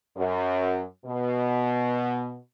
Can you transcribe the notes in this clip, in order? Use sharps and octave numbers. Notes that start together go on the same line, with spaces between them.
F#2
B2